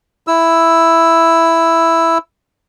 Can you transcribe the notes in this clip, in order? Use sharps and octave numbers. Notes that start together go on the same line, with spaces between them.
E4 E6